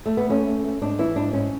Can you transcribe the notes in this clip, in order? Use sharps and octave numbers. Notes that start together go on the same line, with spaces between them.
A3
B3
A3 C#4
A3
A3
G#2 D4
E3 E4
G#2 D4
G#2 C#4